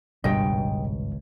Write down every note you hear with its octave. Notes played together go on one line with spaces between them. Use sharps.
G#1 C#2 G2 B2 G3 D#5 G5